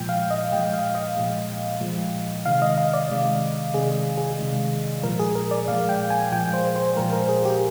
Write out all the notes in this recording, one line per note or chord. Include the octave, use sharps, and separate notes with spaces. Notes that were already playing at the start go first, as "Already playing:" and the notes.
Already playing: A#2 F3 G#3 G5
F5
D#5
A#2 F3 G#3 G5
F5
D#5
A#2 F3 G#3
A#2 F3 G#3
C3 D#3 G#3 F5
D#5
F5
D5
C3 D#3 G#3
C3 D#3 G#3 G#4
G#4
C3 D#3 G#3
A#2 F3 G#3 A#4
G#4
A#4
D5
A#2 F3 G#3 F5
G5
G#5
A#2 F3 G#3 G5
C5
C5
A#2 F3 G#3 A#4
A#4
G#4
G4